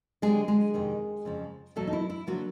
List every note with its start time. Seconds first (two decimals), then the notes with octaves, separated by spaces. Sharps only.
0.22 D3 G3 G#3 C4 G#4
0.48 G#3 G#4
0.74 F2 C3 D#3
1.25 F2 C#3 F3
1.76 E2 B2 F#3 A3 A#3 A4
1.87 D#4
1.93 E4
2.10 E4
2.27 D3 F3 F#3 A#3 F#4